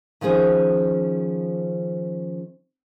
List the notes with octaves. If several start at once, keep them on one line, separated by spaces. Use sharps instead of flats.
D#3 F3 C#4 G#4 C5